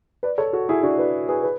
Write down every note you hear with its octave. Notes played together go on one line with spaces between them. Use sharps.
B4 D5
A4 C#5
F#4 A4
E4 G#4
D4 F#4
B4 D5
G#4 B4
B4